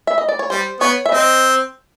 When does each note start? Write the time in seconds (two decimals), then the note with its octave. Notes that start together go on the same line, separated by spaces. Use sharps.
0.07 E5
0.18 D#5
0.29 D5
0.39 C#5
0.50 G3 C5
0.80 B3 C#5
1.06 E5
1.11 C4 D#5